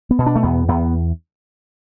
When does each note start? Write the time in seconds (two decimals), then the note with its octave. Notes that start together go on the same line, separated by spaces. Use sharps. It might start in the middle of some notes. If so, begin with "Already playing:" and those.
0.11 B3
0.19 B2
0.26 D4
0.36 A3
0.43 E2 B3
0.69 E2 B3